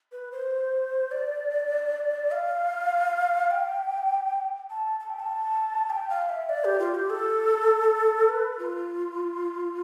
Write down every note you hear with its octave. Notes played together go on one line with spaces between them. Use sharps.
B4
C5
D5
F5
G5
A5
A5
G5
A5
G5
F5
E5
D5
G4
F4
G4
A4
B4
F4